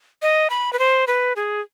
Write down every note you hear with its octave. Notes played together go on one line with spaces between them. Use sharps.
D#5
B5
B4
C5
B4
G#4